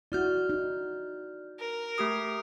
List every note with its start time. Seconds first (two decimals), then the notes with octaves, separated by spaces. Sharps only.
0.12 E4 F#4 D5 F6 G6
0.49 D#4
1.59 A#4
1.98 A3 G4 D#6